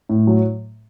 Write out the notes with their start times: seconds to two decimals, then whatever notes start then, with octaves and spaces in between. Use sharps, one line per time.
0.09 A2
0.27 F#3